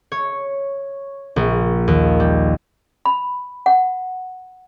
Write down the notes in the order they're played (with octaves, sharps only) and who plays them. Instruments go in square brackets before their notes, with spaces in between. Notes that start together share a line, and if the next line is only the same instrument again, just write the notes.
[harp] C#5
A#1
D#2
G3
[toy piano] B5
F#5